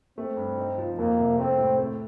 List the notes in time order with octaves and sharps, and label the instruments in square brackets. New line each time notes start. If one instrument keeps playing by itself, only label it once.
[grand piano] A3 [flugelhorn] C4
[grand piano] G2
D#4
F3
[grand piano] F2 [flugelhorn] A#3
[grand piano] C3
[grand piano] A3 [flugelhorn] C4
[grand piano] A2
A3